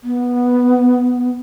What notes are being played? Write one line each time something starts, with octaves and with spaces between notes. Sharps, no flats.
B3